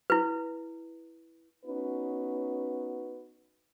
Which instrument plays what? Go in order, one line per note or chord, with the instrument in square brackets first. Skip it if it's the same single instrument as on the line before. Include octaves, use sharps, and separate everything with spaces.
[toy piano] E4 B4
[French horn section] B3 C#4 D#4 F#4 B4